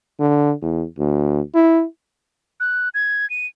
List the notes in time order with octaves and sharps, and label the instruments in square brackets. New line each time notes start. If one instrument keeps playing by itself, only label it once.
[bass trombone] D3
E2
D2
E4
[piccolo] F#6
G#6
D#7